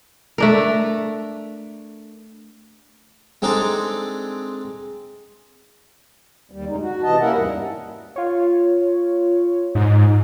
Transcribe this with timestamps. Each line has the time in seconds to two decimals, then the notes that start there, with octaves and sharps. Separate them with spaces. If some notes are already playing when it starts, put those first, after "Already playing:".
0.38 A3 D4 A#4
3.42 G#3 C4 D4 D#4 G#4 A4
6.51 D#2 G3
6.68 F#2 C#3 G#3 D#4
6.81 F#4
7.03 C3 E3 D#5 A5
7.20 A#3 C#4 E4 A#4 E5 F#5
7.34 E2 G#2 G3
8.16 F4 C#5
9.75 G#2